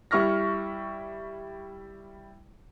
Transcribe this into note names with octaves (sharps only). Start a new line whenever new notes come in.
G3 E4 C#6 F6 A#6